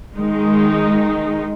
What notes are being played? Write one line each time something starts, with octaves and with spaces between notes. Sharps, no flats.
D#3 G#3 D#4